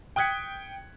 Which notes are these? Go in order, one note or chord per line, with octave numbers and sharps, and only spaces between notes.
G5 D#6 F#6 G#6 B6 C#7